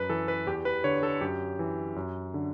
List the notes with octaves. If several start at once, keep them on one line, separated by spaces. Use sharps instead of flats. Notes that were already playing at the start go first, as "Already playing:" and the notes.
Already playing: F#2 B4
E3 A4
B4
E2 G4
B4
D3 C#5
A4
F#2 G4
E3
F#2
D3